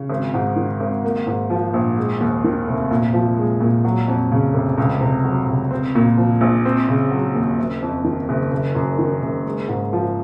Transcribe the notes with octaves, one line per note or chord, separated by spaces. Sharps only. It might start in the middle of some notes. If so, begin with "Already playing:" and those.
Already playing: C#3
G#1
G#2
D#3
G#1
A#3
G#2
F3
A#1
G#3
D#2
D#3
F1
A#2
F3
G#3
A#2
F#3
F2
C#3
F1
C#2
C3
F#3
C#2
C4
A#2
F3
A#1
C4
C#3
F#3
D#2
F#1
F2
D#3
F#1
F#1
F#2
D#3
F#1
G#3
G#2
F3